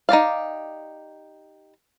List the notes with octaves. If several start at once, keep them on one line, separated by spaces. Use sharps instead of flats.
D#4 G4 D5 F5